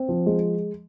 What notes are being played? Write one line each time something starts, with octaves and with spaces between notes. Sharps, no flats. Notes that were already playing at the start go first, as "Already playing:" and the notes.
Already playing: C4
F3
G#3